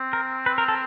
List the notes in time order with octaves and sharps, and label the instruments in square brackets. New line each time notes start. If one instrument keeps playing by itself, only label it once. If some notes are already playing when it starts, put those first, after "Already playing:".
Already playing: [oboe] C4
[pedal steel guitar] A#4
B4
A#4
A4